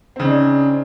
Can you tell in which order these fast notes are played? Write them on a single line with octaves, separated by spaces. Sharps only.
C4 C#3 D#4 D4